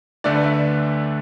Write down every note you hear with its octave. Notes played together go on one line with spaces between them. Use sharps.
D2 D3 A3 D4 D5
B4
E5